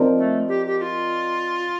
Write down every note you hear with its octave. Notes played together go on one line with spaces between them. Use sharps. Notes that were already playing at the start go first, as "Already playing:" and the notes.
Already playing: F3 C4 D#4 A#4 D5
A3
G4
G4
G4
F4